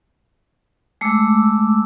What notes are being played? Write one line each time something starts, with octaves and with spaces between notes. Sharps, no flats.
G#3 A3 D6 E6